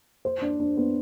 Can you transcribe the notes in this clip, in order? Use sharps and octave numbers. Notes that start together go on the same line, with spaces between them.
C5
D4
D4
B3